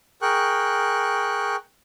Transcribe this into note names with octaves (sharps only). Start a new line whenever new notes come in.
G#4 A#4 G5 C#6 F#6